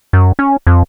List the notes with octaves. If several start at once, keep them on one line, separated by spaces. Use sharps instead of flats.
F#2
C#4
F2